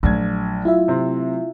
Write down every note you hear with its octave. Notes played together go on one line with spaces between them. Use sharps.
A#1 F#3 A3 G#6
E4 F4 E5
C3 C4